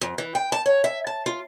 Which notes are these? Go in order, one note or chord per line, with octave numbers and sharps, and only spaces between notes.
F2
E3
G5
A5
C#5
E5
A5
F4